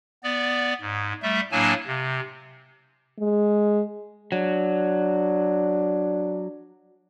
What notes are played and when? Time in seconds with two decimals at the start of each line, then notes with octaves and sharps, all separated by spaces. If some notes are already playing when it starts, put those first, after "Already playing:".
0.23 B3 D5
0.81 G#2
1.23 G3 A3 E5
1.52 A2 F#3 A#3 D4 G#5 A5
1.87 C3
3.20 G#3
4.32 F#3 D4